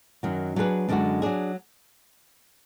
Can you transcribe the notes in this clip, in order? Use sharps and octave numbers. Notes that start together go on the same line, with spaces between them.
F#2 D#3 F#3
F#3 D4 G#4 B4
F#2 D3 G#3 D4 F#4
F#3 D4 G#4